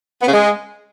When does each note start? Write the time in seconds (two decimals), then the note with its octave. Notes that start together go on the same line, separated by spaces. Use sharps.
0.22 B3
0.27 C#3
0.33 G#3